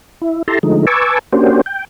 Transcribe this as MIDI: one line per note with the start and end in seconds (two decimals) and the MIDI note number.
0.22 0.42 64
0.48 0.59 64
0.48 0.59 67
0.48 0.59 69
0.48 0.59 81
0.48 0.59 82
0.48 0.59 84
0.63 0.86 50
0.63 0.86 53
0.63 0.86 56
0.63 0.86 57
0.63 0.86 63
0.87 1.19 71
0.87 1.19 80
0.87 1.19 81
0.87 1.19 85
0.87 1.19 86
0.87 1.19 88
1.32 1.61 58
1.32 1.61 61
1.32 1.61 62
1.32 1.61 66
1.32 1.61 67
1.32 1.61 72
1.66 1.85 79